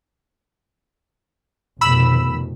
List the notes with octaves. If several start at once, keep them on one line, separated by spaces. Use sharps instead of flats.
F1 B2 D#3 B5 E6